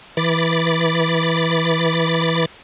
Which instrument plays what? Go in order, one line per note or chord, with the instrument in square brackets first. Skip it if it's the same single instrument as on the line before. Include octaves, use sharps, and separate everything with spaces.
[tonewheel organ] E3 B5 D6 A6